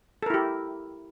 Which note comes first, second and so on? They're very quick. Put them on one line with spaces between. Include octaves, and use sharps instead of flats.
A4 A#4 E4 G4